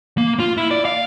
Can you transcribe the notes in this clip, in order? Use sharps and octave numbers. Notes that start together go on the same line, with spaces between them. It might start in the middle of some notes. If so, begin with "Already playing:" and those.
A#3
F4
E4
D5
F5